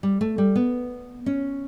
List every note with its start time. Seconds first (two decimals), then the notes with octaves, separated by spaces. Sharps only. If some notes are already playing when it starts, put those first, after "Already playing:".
0.03 G3
0.21 A3
0.38 G3
0.56 B3
1.26 C#4